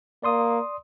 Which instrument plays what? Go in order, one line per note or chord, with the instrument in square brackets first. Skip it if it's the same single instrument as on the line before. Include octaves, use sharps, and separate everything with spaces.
[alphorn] A#3 [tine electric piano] D5 C6 D#6